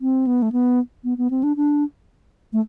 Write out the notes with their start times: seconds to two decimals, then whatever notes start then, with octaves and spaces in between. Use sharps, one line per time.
0.01 C4
0.27 B3
0.42 A3
0.52 B3
1.04 B3
1.18 B3
1.31 C4
1.43 D4
1.57 D4
2.53 A3